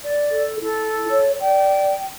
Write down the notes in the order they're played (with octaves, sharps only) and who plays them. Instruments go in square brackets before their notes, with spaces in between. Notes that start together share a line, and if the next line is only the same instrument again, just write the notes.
[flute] D5
[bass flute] A4
[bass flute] E4 [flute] A4
[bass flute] C#5
[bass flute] D5 [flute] G5